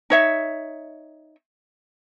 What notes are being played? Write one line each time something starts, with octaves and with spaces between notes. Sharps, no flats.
D#4 C#5 E5